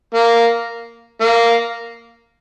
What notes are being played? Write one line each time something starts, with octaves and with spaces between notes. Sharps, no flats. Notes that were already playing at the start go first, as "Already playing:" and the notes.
A#3
A#3